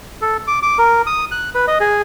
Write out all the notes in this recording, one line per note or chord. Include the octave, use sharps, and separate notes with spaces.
A4
D6
D6
A#4
D#6
F#6
B4
D#5
G#4